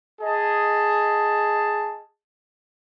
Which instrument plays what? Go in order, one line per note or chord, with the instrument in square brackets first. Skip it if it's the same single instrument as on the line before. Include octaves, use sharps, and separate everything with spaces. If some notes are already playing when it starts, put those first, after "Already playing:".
[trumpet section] G#4 D#5 A5